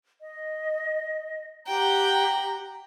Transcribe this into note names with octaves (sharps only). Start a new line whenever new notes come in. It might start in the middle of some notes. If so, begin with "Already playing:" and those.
D#5
G4 F#5 G5 A#5